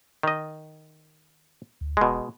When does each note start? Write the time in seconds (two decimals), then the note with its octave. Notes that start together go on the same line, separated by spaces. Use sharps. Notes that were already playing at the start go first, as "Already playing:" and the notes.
0.23 D#3 D#5
1.81 D2
1.97 E1 B2 G#3